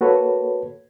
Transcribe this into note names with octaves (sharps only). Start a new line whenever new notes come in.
A#3 F#4 A4 B4 C#5